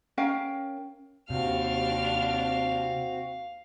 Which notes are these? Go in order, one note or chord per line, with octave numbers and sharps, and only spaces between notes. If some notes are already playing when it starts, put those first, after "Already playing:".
C#4 A#4 F5 G5
D#2 C3 C4 D4 F#4 F5 F6